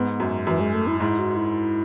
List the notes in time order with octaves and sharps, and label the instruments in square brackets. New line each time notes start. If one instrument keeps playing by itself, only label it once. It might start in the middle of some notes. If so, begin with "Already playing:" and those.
Already playing: [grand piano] G#2 [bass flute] B3
[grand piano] F#2
[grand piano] F#2 [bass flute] E3
[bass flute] G#3
A3
E4
[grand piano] G#2 [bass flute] E4
[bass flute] F#4
E4